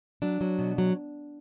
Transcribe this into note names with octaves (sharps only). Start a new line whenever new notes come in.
F#3 D4
F#3
B2
F#3